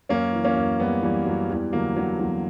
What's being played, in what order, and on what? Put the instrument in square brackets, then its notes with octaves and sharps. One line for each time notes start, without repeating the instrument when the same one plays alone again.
[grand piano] F#2 A#3 C#4
E3
A#3 C#4
F#2
F#2 G3 B3
F#2 E3 G3
F#2 F#3
E2 E3 G3
D3 F#3 A#3
D3 F#3
E2 F#3